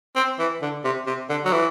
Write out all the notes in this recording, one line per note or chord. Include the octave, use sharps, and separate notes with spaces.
C4
E3
D3
C3
C3
D3
F#3
E3